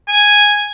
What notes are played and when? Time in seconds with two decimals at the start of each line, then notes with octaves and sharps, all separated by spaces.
0.08 G#5